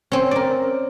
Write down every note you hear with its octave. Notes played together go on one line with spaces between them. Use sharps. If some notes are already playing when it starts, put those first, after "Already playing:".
C4 C#4
A#4 D5